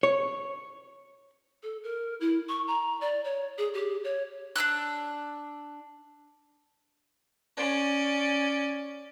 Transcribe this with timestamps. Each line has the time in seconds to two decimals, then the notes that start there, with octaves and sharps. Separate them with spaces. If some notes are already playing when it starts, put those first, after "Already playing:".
0.03 C#5
1.63 A4
1.83 A#4
2.20 E4
2.49 C#6
2.67 A#5
3.01 D5
3.24 C#5
3.58 G#4
3.74 G4
4.04 C#5
4.56 D4 A#5 E6 F#6
7.57 C#4 D5